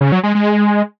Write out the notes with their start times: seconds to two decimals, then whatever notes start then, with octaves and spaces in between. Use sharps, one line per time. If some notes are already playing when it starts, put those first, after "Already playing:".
0.01 C#3
0.12 F#3
0.23 G#3
0.35 G#3